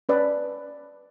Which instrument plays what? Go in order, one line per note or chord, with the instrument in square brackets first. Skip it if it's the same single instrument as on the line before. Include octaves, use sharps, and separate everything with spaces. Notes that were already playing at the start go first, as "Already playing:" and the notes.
[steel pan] C#4 B4 D5